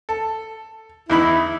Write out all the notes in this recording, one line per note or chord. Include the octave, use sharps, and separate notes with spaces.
A4
E2 D#4 E4 B5